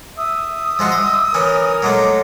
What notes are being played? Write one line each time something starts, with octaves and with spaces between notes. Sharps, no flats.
E5 D#6
F3 G#3 F#4
D#5
E3 C#4 A#4
F#3 G#3 A3 D6